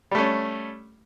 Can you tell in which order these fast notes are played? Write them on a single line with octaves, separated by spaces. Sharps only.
G3 A3 C#4